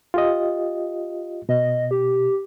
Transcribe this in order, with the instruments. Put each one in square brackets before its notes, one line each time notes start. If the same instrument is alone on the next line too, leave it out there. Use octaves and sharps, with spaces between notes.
[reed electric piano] F4 G4 D#5
[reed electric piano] B2 [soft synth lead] D#5
[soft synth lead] G4